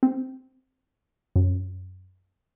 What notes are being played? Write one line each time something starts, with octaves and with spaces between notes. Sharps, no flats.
C4
F#2